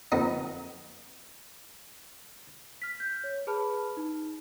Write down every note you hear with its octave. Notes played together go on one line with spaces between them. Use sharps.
F2 A#2 F3 B3 D#4
F6 B6
G6
C#5
G#4 B4 A5 B5 F6
D#4